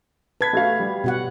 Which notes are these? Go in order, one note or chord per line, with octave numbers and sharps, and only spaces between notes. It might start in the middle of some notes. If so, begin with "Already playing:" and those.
B4 A5 G#6 B6
A3 F#4 F5
G3
B2 F#4 F#5